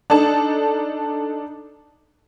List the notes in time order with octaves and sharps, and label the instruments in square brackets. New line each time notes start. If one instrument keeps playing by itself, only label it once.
[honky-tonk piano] D4 D#4 A4 A5